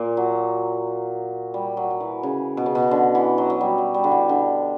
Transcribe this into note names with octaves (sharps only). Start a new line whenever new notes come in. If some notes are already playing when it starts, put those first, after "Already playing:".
Already playing: A#2 A#3
F#3
G3
F#3
F#3
E3
C#3
B2
C#3
B2
D3
E3
F#3
F#3
G3
F#3
G3
D3
E3
D3